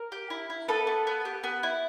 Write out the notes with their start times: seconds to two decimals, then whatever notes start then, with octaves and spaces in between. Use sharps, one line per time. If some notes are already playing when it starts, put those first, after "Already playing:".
Already playing: A#4
0.12 G4
0.30 E4
0.50 E4
0.68 B3 A4 B4
0.87 B3
1.07 B3
1.25 G4
1.44 B3
1.63 E4